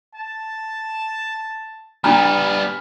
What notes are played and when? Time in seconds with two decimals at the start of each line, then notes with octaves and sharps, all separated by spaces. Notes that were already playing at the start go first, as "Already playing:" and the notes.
0.14 A5
2.04 G3 B3 D4 G#5 A#5 B5 F6